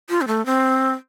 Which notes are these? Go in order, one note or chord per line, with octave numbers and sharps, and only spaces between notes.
F4
C4
A3
C4